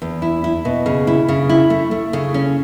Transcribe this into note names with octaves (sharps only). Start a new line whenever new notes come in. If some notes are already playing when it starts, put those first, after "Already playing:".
E2
E4
E4
B2
C#3
E4
C#3
E4
A3
A3
C#3
C#4